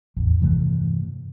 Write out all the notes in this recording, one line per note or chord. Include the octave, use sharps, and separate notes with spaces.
A1 E2
G2 C3 E3 A3